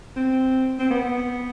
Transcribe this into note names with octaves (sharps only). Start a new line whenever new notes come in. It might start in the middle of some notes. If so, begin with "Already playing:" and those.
C4
C4
B3